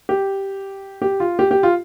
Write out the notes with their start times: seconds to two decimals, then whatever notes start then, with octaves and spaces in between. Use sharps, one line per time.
0.09 G4
1.02 G4
1.20 F4
1.39 G4
1.51 G4
1.63 F4